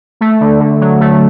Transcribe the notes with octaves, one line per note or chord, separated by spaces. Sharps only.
A3
D3
D3
F#3
A3